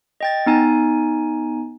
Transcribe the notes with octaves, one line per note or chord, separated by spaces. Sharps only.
D#5 G5 A6
B3 D#4 G#5